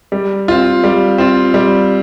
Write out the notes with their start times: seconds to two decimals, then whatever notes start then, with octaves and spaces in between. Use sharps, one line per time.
0.12 G3
0.48 C4 F4
0.84 G3
1.18 C4 F4
1.54 G3